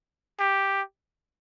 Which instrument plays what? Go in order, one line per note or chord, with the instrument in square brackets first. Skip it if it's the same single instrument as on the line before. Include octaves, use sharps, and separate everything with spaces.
[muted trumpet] G4